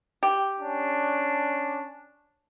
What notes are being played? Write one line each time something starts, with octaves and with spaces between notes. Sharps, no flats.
G4
C#4 D4